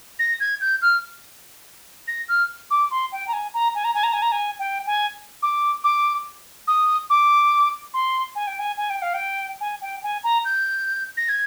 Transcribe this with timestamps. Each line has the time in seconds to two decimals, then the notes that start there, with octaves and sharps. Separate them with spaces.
0.19 A#6
0.40 G#6
0.61 G6
0.82 F6
2.08 A#6
2.29 F6
2.71 D6
2.91 C6
3.12 G5
3.28 A#5
3.33 G#5
3.54 A#5
3.75 G#5
3.84 A#5
3.94 G#5
4.03 A#5
4.13 G#5
4.22 A#5
4.32 G#5
4.59 G5
4.87 G#5
5.42 D6
5.84 D6
6.68 D#6
7.10 D6
7.94 C6
8.35 G#5
8.47 G5
8.59 G#5
8.77 G#5
8.90 G5
9.02 F5
9.14 G5
9.61 G#5
9.82 G5
10.03 G#5
10.24 A#5
10.45 G6
11.17 A#6
11.29 G#6